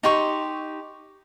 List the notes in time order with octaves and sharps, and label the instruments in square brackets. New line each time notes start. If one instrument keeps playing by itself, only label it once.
[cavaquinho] D#4 G4 C6 C#6